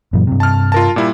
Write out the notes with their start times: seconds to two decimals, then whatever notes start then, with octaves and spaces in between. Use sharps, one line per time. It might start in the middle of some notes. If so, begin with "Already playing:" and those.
0.13 F#2 A#2 E3
0.27 G2 C3
0.40 A5 F6
0.72 F4 A#4 A5
0.96 A#2 G3 E4